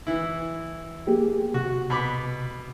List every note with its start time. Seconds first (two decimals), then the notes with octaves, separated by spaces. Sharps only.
0.07 E3 E4
1.07 A#3 G4 G#4
1.54 C3 F#4
1.90 B2 B5 D6